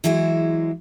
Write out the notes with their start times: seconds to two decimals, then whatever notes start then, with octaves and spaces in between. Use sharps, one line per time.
0.04 E3 F#3 G#3 E4 C5